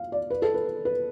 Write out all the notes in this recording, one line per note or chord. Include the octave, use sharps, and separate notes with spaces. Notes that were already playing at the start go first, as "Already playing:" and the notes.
Already playing: F5
D5
B4
A4
B4
B4